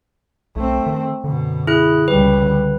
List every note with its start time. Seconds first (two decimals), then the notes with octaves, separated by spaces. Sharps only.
0.56 B1 A3 C4
0.86 D#3
1.24 F#2 B2 D3
1.67 E4 G#4 F#6
2.08 C#2 G3 B4
2.42 D3